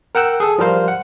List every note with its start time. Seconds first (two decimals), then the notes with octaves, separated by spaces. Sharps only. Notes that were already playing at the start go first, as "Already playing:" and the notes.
0.15 A#4 F#5 G5 E6 F#6
0.40 G#4 A4
0.58 F3 G3 A#4 C5 F5
0.88 F#5